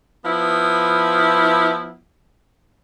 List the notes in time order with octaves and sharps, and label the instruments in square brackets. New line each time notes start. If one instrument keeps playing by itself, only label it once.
[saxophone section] F3 B3 E4